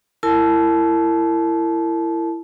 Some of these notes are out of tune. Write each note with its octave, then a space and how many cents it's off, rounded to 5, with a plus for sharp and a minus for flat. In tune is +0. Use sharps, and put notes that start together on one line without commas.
E4 +20 A#4 -35 A5 -20